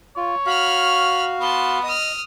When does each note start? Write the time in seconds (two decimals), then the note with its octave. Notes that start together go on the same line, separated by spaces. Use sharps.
0.17 F4 C#5
0.46 F#4 F5 B5 F6
1.41 B3 A5 C6
1.83 D#5 D#6 F6